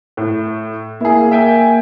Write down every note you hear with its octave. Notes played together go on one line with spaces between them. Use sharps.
A2
A#3 E4 G#4
E5 G5 G#5